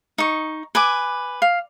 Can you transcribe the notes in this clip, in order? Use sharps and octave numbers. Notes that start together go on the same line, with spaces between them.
D#4 C#6
B4 G#5 D6
F5